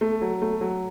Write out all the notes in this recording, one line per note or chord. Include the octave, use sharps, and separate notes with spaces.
A3
F#3
A3
F#3